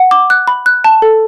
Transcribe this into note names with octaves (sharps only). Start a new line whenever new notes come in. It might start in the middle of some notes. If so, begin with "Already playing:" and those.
Already playing: F#5
D6
F#6
B5
F#6
A5
A4